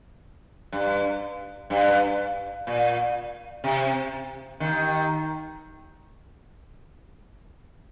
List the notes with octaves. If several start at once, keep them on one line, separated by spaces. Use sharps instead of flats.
G2
G2
A#2
C3
D#2 D#3